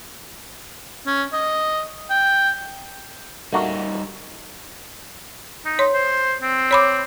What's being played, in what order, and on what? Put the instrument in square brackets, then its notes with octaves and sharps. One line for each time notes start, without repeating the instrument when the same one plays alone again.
[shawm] C#4
D#5
G5
[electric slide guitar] G3 D#4 [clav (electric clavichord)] A3 A#3 F#4
[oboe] D#4
[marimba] C#5 C6
[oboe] C5
C4
[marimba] C#5 B5 D6